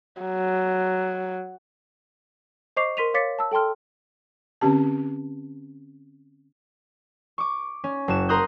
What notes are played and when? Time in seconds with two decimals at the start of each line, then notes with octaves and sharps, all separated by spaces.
0.22 F#3
2.77 C5 D#5 C#6 D6 C7 F7
2.97 A#4 C6 B6 D#7 F7
3.14 C#5 F5 D6 A6 B6 C#7
3.39 A5 E6
3.52 A4 G5 A5 C6 F6
4.61 D3 C4 C#4 G4 A5
7.38 C#6 D6
7.84 C#4
8.08 F#1 F#4 E7
8.29 A#4 A#5 C6 D#6 F#6 G6